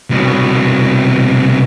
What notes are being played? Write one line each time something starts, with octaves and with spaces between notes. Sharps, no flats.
C2 B2